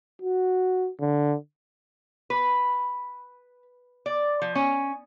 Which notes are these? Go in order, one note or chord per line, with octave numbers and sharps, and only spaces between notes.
F#4
D3
B4
D5
F3
C#4